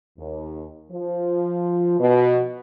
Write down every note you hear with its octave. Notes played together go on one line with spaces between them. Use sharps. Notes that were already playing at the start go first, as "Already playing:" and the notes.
D#2
F3
B2